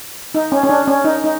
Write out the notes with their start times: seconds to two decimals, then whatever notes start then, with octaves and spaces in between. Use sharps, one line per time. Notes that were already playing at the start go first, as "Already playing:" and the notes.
0.35 D#4
0.52 C#4
0.63 C#4
0.69 D4
0.88 C#4
1.05 D#4
1.24 D#4